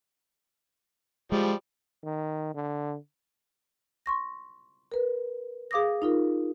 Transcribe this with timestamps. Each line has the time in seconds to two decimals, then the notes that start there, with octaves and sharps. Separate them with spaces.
1.32 F3 G3 G#3
2.04 D#3
2.55 D3
4.06 C6 C#6 A#6
4.92 A#4 B4
5.71 G#4 F5 D6 D#6 A#6
6.02 D#4 F4 A#4